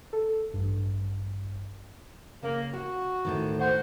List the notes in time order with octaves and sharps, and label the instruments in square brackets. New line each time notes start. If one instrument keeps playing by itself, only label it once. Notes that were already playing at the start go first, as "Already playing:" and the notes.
[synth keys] A4
A1 G2
[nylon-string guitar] C#3 [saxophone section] A#3
[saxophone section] F#4 [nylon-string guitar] F#5
[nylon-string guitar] D2 A2 D#3
[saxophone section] F#4 C5